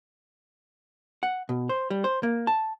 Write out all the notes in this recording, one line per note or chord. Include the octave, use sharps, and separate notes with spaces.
F#5
B2
C5
G3
C5
A#3
A5